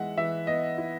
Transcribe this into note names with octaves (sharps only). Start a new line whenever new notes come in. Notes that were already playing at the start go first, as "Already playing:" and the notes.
Already playing: E3 G#3 E5 F#5
E3 E5
B3 D#5
E4